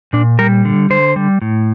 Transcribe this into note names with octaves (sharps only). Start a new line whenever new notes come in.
A#2 D4
G3 A#4
D3
D3 C5
G3
A2